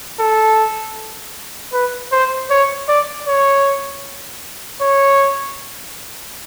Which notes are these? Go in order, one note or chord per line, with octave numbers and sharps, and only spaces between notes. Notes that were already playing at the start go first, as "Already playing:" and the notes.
A4
B4
C5
C#5
D5
C#5
C#5